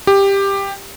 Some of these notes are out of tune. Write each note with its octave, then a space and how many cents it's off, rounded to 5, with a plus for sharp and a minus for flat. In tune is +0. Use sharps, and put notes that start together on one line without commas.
G4 +10